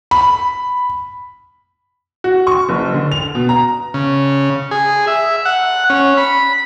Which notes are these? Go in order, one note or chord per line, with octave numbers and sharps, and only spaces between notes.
B5
F#4
C#6
F#1
D3
F7
B2
A#5
C#3
G#4
E5
F#5
C#4
B5